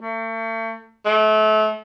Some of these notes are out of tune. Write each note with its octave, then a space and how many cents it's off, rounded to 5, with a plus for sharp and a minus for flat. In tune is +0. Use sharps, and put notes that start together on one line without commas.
A3 +40
A3 -30